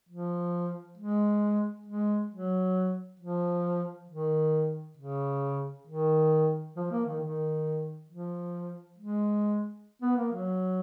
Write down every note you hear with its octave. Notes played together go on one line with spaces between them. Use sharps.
F3
G#3
G#3
F#3
F3
D#3
C#3
D#3
F3
A#3
D#3
D#3
F3
G#3
B3
A#3
F#3